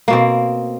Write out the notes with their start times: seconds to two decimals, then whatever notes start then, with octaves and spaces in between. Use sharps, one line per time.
0.08 A#3
0.10 B2
0.13 C4